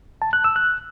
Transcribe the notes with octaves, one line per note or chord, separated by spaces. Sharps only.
A5
F#6
E6
F#6